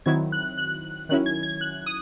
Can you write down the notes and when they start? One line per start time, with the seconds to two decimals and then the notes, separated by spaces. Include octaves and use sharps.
0.06 D#3 F#3 C4 E4 G#6
0.32 F#6
0.58 F#6
1.09 D#3 F#3 C#4 E4 F#6
1.26 G#6
1.43 G#6
1.61 F#6
1.86 D#6